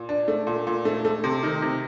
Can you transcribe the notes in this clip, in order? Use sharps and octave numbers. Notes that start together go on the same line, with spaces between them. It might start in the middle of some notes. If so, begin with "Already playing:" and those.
Already playing: A#2
D4
A3
A#2
A#2
A3
A3
C3
D#3
C3